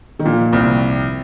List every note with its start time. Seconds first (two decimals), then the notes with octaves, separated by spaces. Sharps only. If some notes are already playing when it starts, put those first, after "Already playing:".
0.19 D#3
0.25 A#2 F3
0.53 C2 C4